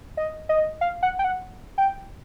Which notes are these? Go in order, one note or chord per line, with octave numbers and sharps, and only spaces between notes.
D#5
D#5
F5
F#5
G5
F#5
G5